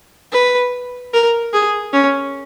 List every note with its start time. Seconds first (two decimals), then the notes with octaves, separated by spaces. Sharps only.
0.32 B4
1.13 A#4
1.53 G#4
1.93 C#4